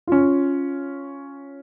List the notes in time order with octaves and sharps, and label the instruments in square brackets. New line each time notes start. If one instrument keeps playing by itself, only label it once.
[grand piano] C#4 F4